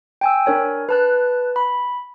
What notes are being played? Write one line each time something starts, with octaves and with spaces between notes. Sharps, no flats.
G5 G#5 E6
D4 A#4 C#5 G#5
B4 A5 F#6
B5